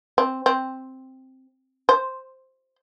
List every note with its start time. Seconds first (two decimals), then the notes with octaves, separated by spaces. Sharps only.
0.18 C4
0.46 C4
1.89 C5